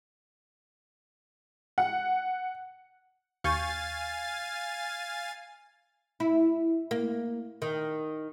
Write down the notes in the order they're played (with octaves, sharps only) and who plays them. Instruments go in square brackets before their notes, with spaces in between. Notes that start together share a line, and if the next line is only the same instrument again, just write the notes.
[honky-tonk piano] F#5
[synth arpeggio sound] D#2 C#6 G6 [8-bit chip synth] F5 G#5 A6
[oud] E4
A#3
D#3